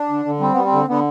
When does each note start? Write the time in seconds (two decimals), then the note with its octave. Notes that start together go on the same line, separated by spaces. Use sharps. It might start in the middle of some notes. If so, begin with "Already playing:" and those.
Already playing: D4
0.09 D3
0.25 D3
0.40 G3 C4
0.53 G3 B3
0.64 C4
0.72 D3
0.88 D3 B3